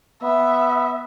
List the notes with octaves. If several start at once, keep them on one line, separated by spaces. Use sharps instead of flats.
B3 E5